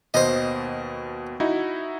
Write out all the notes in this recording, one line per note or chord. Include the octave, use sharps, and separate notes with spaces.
D#2 B2 C5 D#5
D#4 E4 F#4